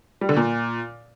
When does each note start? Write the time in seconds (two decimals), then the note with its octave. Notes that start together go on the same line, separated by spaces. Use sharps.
0.21 G3
0.29 D3
0.36 A#2